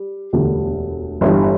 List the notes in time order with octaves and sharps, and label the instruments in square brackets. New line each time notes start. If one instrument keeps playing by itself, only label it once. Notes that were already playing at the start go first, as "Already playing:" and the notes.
Already playing: [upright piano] G3
E1 D2 D3 G3
G1 G2 E3 G3